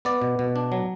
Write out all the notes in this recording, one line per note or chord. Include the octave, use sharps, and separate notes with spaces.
B3 D5
B2
B2
D4
F#3